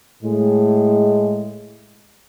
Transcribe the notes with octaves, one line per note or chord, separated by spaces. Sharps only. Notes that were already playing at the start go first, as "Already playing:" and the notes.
A2 G#3